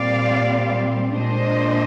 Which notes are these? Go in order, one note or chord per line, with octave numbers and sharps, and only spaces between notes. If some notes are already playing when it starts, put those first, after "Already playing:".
Already playing: A#2 G3 C4 D5 F5
A#2 G#3 D4 C5 D#5